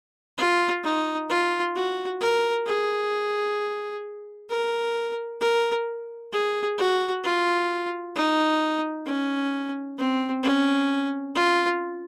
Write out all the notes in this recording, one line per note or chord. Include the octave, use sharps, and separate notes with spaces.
F4
D#4
F4
F#4
A#4
G#4
A#4
A#4
G#4
F#4
F4
D#4
C#4
C4
C#4
F4